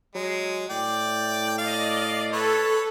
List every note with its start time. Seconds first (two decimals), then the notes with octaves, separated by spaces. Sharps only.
0.15 F#3 G#3
0.70 A2 D5 G5
1.58 D5 D#5 F5
2.33 A4 B4 C#5